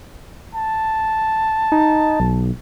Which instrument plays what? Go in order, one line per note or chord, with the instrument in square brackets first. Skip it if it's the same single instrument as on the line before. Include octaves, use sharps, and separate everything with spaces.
[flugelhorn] A5
[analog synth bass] D#4
B1